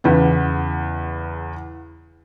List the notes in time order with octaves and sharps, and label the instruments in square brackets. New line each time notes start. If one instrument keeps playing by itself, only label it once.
[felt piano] E2 C#3 B3